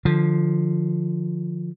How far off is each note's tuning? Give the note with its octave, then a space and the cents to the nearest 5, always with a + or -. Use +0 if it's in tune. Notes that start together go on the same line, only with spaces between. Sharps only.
D3 +25 F3 +0